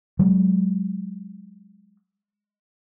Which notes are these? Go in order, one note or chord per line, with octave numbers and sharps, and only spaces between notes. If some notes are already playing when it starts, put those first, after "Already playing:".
F#3 G#3